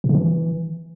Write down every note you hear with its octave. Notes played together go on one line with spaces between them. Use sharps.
A#2
C#3
E3